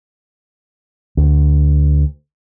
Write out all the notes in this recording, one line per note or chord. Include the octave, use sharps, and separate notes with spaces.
D2